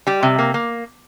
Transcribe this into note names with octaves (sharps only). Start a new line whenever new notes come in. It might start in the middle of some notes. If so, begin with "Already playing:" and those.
G3 G4
C3
A#3
A#3